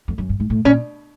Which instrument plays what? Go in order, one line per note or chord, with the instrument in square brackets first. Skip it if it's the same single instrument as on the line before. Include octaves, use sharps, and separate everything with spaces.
[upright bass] F2
F#2
G2
G#2
A2
[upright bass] A#2 [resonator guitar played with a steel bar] C#4